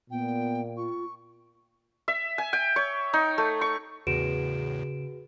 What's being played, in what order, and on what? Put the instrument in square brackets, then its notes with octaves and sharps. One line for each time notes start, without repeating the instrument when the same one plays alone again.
[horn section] A#2 [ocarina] B3 [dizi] G5
[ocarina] F4 [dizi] C#6
[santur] E5
G#5
G5
C#5
D#4
A3
C#6
[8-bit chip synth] E2 A2 [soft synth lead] C#3 [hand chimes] F#4 G#4 B4 [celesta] D7 E7